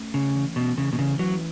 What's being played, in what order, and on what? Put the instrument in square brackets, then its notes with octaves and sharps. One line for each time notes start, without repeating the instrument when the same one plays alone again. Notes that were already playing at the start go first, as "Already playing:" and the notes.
Already playing: [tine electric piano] A3 C#4
[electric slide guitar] C#3 [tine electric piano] C#4
[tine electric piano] E3
[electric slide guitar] B2 [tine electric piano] C#4
[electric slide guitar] C#3 [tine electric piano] E3
[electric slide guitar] B2
[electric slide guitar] C#3 [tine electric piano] E3
[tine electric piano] E3 [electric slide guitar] F#3